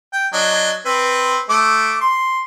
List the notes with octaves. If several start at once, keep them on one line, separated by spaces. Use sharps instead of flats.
G5
F#3 D4 D#5
C4 B4
A3 D6
C6